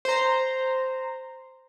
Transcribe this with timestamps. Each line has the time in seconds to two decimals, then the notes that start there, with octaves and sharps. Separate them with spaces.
0.05 C5 A#5